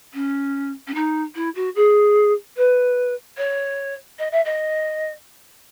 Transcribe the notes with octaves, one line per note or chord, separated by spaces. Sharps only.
C#4
C#4
D#4
E4
F#4
G#4
B4
C#5
D#5
E5
D#5